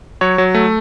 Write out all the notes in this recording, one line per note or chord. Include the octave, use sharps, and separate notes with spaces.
F#3 C#5
F#3
A3